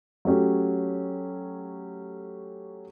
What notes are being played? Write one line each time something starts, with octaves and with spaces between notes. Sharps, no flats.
F#3 A3 C#4 G4